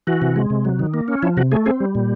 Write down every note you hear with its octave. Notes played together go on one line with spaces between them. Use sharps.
E3 F#4
C3
G#3
C3
F#3
D#3
A#3
C#4
F3 E4
C3 F#4
A3 G#4
C4 G#4
G3
A#2